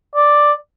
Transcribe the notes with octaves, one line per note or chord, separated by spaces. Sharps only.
D5